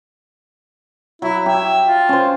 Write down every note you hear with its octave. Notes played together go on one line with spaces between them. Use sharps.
F#3 E4
G4 E5
F4
C#4 C5